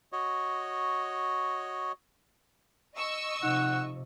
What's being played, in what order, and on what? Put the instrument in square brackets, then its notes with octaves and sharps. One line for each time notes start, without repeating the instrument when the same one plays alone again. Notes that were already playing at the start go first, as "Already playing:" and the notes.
[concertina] F#4 C#5 D#5
[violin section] D#5 C#6 E6
[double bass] C3 F3 [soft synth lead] D#4 [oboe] F#5